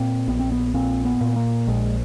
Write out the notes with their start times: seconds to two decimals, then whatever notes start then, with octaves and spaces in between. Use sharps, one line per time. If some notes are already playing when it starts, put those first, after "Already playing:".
Already playing: A#2 C4
0.28 A#1 B3
0.39 C4
0.52 B3
0.74 A#2 C4
1.05 B3
1.21 A#2
1.36 A#3
1.67 A#1 G#3